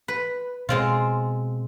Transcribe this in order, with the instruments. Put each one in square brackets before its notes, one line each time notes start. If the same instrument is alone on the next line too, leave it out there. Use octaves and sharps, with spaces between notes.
[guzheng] B4
[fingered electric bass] B2 [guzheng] G#3 C4 F4